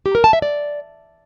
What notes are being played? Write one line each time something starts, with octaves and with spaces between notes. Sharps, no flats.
G4
A#4
A5
E5
D5